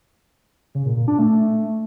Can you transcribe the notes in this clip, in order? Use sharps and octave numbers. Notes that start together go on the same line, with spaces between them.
C#3
A#2
A#2
D4
A3